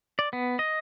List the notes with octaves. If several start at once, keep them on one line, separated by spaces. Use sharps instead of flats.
D5
B3
D#5